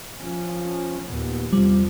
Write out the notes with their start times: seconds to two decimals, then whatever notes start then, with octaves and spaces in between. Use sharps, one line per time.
0.21 F3 C#4
1.05 D#2 A#2 B3
1.52 E2 C3 F3 G3